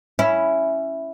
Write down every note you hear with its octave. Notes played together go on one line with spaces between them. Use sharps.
C#4 E4